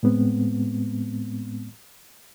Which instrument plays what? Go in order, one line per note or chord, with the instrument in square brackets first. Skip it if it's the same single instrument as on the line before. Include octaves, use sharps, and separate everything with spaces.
[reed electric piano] A2 G#3 B3 C4